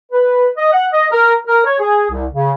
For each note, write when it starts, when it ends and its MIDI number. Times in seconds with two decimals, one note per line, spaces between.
0.12 0.47 71
0.57 0.69 75
0.72 0.86 78
0.92 1.06 75
1.11 1.34 70
1.47 1.64 70
1.65 1.78 73
1.79 2.06 68
2.11 2.26 36
2.32 2.52 49